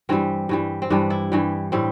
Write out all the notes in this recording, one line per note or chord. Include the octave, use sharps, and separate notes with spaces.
G2 E3 G3 C4
G2 E3 G3
C4
G2 E3 G3 D4
E4
G2 E3 G3
A2 G3 C4